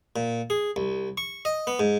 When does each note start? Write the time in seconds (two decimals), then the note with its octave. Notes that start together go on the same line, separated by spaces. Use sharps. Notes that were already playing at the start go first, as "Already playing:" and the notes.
0.16 A#2
0.50 G#4
0.76 C2
1.18 C#6
1.45 D#5
1.67 B3
1.79 G#2